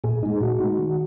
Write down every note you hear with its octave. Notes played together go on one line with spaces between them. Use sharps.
A#2 G#4
G#3 D#4
A#2 F#4
G#3 D#4
D#3